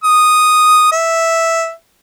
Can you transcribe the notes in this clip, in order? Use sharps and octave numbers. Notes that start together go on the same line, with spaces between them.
D#6
E5